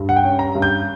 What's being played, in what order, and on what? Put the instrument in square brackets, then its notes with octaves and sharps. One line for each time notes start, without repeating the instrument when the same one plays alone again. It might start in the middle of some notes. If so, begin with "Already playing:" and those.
Already playing: [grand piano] G2
F#5
G5
C#4
A#5
G2
G6